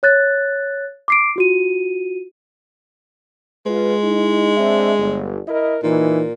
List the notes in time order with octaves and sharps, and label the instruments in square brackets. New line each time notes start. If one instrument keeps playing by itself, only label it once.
[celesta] C#5 F#6 A6
D6 C7 D7
F4 F#4 D#7
[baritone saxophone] G#3 [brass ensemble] F4 B4
[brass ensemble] D#4 E4
C4 D4 E5
G1
E4 A#4 D#5
[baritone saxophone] A#2 [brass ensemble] E3 D#4